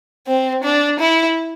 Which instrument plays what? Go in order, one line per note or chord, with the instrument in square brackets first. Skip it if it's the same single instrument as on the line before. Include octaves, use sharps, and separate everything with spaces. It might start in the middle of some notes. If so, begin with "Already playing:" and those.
[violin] C4
D4
E4